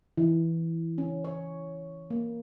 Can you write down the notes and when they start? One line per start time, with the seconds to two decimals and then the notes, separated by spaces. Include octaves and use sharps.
0.18 E3
0.98 C#4
1.24 C#5
2.10 A#3